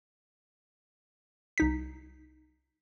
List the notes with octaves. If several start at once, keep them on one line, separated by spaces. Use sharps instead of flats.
C2 D#4 B6